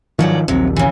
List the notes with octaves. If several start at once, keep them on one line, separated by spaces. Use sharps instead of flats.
G#2 D#3 F3 F#3 D5
A#1 D#2 C3 F#3
C#3 E3